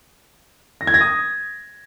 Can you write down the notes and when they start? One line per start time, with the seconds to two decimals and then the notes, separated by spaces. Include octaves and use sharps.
0.81 A#6
0.87 G#6
0.94 A#6
1.01 D#6